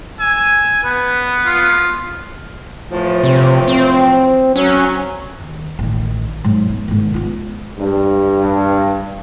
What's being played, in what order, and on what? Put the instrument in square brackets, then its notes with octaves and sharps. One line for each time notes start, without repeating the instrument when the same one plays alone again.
[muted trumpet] G#5 [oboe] E6
[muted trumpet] B3 [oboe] B4
[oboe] F4
[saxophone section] A2 E3 F3
[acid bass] C3
C4
[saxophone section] F#3 [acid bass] C#4
[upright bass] D#2
A1 D#3
G#2 F#3
B3
G#2 D#3
B3 F4
[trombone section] G2